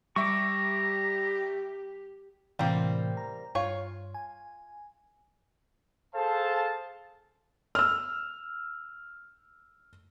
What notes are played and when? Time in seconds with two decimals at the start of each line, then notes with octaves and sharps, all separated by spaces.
0.16 G3 G4 E5 A#5 C#6 D6
2.59 A2 C3 E3 G3 A#3 C4
3.17 A#5
3.55 G2 F4 C#5
4.14 G#5
6.15 G#4 A4 C5 F5 A5
7.75 E6 F6